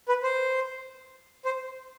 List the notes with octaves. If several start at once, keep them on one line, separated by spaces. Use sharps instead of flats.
B4
C5
C5